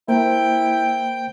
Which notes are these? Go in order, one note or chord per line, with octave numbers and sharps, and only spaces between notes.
A#3 E4 A#4 C5 G5